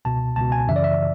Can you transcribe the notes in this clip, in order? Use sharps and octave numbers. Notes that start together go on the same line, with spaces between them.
C#2 B2 A5
C#2 B2 A5
G#5
F#2 C#3 E3 E5
D5
E5